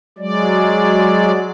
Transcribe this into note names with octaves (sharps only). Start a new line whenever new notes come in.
F#3 G#3 D5